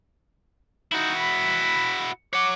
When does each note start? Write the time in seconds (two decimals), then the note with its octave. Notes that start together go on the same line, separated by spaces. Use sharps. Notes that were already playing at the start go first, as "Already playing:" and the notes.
0.92 D#4 E4 F#4
1.15 B5
2.33 C#5 F#5 D6